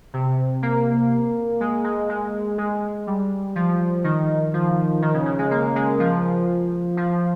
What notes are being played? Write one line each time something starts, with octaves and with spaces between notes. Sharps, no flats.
C3
A#3
G#3
G#3
G#3
G#3
G3
F3
D#3
F3
D#3
C#3
C#3
G#3
A#3
G#3
F3
F3